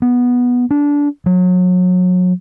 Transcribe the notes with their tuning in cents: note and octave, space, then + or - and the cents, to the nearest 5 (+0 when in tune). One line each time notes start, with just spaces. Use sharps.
B3 -10
D4 -20
F#3 -30